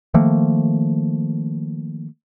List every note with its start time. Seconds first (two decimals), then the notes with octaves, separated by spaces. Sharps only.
0.14 D#3 F3 A3 A#3